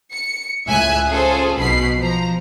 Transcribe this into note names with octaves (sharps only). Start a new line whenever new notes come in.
C#7
C#2 A2 E5 G#5 F#6
C#4 F4 G#4 A4 C5
B1 B2 B5 C7
F3 A#5